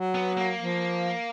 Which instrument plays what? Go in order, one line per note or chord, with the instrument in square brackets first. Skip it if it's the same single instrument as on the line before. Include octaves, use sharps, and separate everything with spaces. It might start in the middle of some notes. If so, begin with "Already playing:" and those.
Already playing: [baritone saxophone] F#3
[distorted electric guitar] B3
A#3
[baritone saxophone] F3